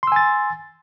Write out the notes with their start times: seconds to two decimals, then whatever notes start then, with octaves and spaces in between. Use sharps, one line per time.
0.03 C6
0.07 E6
0.12 G#5
0.16 A6